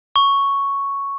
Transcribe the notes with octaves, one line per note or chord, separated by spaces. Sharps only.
C#6